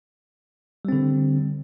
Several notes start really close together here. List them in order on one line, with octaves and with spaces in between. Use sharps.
G3 C4 D3